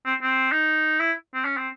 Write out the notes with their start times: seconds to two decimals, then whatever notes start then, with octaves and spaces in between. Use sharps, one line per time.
0.06 C4
0.23 C4
0.52 D#4
1.00 E4
1.34 C4
1.45 C#4
1.57 C4